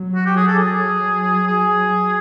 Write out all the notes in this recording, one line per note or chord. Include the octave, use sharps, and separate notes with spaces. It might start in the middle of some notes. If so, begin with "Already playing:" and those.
Already playing: F#3
F#4
G4
G#4
A4
G#4
F#3
F#3 G#4